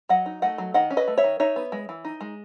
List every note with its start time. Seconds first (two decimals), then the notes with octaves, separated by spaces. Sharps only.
0.09 F#3 D#5 F#5
0.26 D#4
0.42 A3 D#5 F#5
0.58 F#3
0.74 D#3 D#5 F#5
0.90 C#4
0.97 B4 D#5
1.08 A3
1.17 C#5 E5
1.24 D#3
1.40 D#4 C#5 E5
1.56 B3
1.72 G#3
1.89 E3
2.04 D#4
2.21 G#3